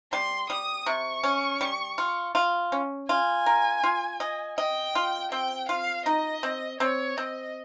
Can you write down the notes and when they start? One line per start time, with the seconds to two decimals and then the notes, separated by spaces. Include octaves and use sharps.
0.12 G3 C6
0.50 G3 D#6
0.86 C3 C#6
1.24 C#4
1.61 G3
1.98 F4
2.35 F4
2.72 C#4
3.09 F4 G#5
3.46 A#4
3.83 F4
4.20 D#5
4.58 D#5 G5
4.95 F4
5.31 C4 G5
5.69 F4 F5
6.06 D#4 D#5
6.43 C4
6.80 C4 C#5
7.17 C4 D#5